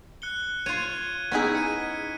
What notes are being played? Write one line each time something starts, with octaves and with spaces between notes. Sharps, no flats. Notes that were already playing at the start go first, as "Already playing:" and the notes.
F#6 C#7 G7
F4 C#5 G#6 D#7
B3 C#4 D#4 E4 G#4
B6 C#7 D#7